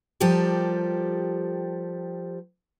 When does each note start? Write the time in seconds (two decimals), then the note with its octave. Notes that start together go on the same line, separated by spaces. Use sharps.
0.20 F3 G3 G4 A4 A#4